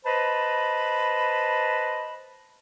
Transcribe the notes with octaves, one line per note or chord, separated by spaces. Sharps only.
B4 C5 D#5 A5 B5